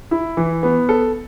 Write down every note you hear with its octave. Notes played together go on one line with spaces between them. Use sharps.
E4
E3
B3
A4